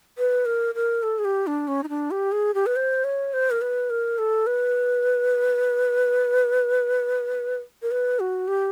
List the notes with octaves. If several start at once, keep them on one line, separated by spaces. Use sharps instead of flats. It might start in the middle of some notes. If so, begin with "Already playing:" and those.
B4
A#4
A#4
A4
G#4
G4
D4
C#4
D#4
D4
G4
G#4
G4
B4
C5
C#5
C5
A#4
B4
A#4
A4
B4
A#4
B4
F#4
G4